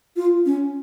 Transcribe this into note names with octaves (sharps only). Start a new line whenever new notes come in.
F4
C#4